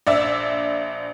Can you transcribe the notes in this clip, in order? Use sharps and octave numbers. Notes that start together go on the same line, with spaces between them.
A#1 D5 E5 E6